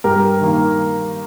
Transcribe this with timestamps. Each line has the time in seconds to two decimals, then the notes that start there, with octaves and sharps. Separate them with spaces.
0.04 G2 G4 A#4
0.41 D#3 A#3